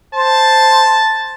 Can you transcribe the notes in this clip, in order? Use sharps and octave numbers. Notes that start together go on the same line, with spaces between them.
C5 A5